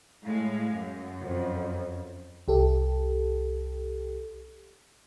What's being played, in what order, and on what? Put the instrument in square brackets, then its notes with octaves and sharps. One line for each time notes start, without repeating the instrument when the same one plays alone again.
[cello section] A2 G#3 F5
F#2
[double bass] F2
[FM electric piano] C2 G4 A4